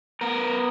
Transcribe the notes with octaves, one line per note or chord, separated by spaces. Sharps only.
B3 A#4